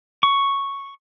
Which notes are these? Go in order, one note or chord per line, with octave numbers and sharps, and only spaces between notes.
C#6